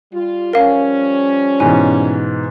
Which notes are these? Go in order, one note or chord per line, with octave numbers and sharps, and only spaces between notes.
G3 F4
F3 G3 C#4 A#4 F5
G#2 B2 E3 G#5